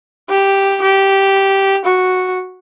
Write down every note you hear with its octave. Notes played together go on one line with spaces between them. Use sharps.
G4
G4
F#4